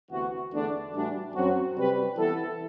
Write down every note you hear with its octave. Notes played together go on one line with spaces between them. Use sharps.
D2 C3 E3 B3 F#4
E2 D3 A3 D4
A2 E3 G3 D4 F#4
F#2 F#3 C4 F#4
C3 G3 C4 G4 B4
E3 B3 E4 A4